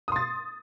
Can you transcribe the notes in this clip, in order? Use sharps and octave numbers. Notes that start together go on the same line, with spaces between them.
C6 D#6 A6